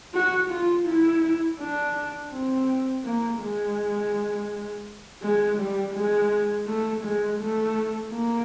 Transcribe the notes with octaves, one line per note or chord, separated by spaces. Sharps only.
F#4
F4
E4
D4
C4
A#3
G#3
G#3
G3
G#3
A3
G#3
A3
A#3